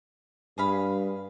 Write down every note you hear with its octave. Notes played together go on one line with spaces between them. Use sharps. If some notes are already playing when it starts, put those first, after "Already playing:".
G2 G#4 F5 B5